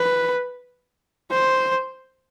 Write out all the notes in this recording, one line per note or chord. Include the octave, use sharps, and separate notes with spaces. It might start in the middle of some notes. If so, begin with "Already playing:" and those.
Already playing: B4
C5